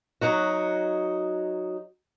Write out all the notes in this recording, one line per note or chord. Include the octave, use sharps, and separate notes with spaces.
F#3 D#4 F#4